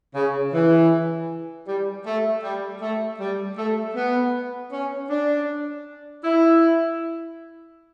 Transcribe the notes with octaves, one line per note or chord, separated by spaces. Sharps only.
C#3
E3
G3
A3
G3
A3
G3
A3
B3
C#4
D4
E4